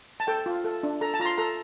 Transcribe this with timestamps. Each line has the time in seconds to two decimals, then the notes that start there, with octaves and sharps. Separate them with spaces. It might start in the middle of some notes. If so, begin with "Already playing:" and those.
0.20 A5
0.27 A4 G5
0.46 F4
0.65 A4
0.83 D4
1.01 A4 A#5
1.14 A5
1.20 F4 A#5
1.25 C6
1.38 A4 A#5